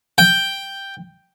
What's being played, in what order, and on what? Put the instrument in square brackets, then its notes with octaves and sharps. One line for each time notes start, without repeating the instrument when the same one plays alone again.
[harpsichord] G5